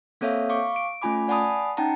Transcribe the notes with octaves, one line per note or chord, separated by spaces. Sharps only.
A#3 C4 A4 C#5 E5 F5
F5 C#6 D6
D7
A3 C#4 F4 G#5 B5 D6
D5 F#5 G#5 A5 B5 D#6
C#4 D#4 F#5 G5 A5 A#5